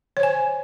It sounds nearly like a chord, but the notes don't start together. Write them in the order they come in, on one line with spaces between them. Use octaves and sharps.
C#5 C5 G#5